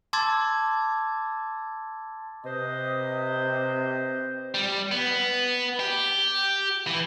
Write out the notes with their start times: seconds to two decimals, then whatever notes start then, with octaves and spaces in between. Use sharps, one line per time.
0.13 A5 C6 D6 E6 G#6 A6
2.44 C3 B4 C5 D#5
4.55 G3
4.91 B3
5.80 G4
6.87 E3